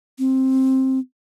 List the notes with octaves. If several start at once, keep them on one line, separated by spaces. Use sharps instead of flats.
C4